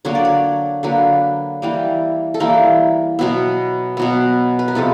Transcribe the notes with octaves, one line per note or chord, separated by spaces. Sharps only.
D3 F#3 A#3 C#5
D5
C#5
D3 F#3 A#3 B4
E3 G3 A#3
A4
E3 G3 A#3 A#4
B2 F#3 B3
B2 F#3 B3
B4
A#4
C3 F3 G#3 B3 A4